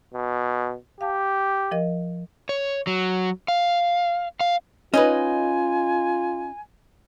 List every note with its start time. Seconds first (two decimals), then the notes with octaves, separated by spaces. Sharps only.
0.14 B2
1.01 G4 F5 A5
1.71 F3 A#4 D#5
2.49 C#5
2.87 F#3
3.48 F5
4.41 F5
4.94 C#4 D#4 F4 B4 D#5 G#5